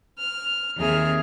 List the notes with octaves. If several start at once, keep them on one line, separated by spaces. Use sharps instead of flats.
F6
D#2 C4 G#4 E5 F6